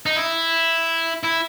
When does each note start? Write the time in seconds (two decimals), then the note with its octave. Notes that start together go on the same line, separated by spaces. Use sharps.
0.06 D#4
0.16 E4
1.23 E4